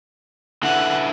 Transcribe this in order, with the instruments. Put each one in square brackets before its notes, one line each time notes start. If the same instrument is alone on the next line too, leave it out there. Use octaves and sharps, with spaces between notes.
[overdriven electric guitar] D3 E3 [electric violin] F#5